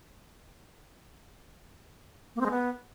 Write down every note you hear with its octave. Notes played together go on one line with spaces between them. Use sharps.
A#3
C4
G#3
B3